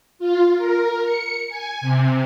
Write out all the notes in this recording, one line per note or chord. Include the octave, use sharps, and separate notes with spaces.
F4
A#4
C#7
G#5
C3